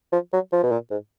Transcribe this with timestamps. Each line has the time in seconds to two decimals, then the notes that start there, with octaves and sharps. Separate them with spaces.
0.13 F3
0.33 F#3
0.53 F3
0.63 B2
0.72 A#2
0.91 G#2